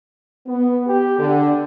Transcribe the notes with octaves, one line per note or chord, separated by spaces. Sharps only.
B3
G4
D3